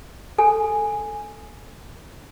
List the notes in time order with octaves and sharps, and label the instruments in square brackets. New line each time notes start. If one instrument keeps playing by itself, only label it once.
[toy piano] A4 G#5